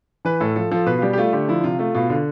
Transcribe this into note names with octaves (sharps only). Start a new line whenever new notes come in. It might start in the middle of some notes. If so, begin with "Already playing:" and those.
E3 B4
A2 A4
F3 A4
F3 A4
B2 B4
F4
G3 G4
G4
A3 F4
D3 G4
F3 E4
C3 F4
A3 F4
B2 F4
D3 F4